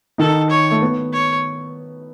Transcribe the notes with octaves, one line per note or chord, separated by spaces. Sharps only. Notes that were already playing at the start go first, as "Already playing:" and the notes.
D#3 D#4 A4
C#5
A3
B3
C#5